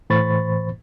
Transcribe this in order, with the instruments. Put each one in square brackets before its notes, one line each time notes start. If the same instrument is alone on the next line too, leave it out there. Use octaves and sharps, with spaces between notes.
[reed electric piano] A2 E3 C5 B5 C#6 A6